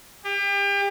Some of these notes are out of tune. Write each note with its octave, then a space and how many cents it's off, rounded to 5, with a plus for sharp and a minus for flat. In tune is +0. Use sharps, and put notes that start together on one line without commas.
G4 +35